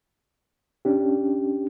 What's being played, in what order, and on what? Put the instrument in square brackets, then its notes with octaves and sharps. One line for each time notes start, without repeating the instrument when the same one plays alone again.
[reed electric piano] C#4 D4 G4